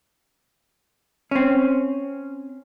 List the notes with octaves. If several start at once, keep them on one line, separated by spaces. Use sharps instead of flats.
C4 C#4